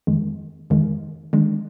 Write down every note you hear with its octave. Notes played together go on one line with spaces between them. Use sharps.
F2 D#3 G#3
F2 D#3 G#3
D#3 G#3 D4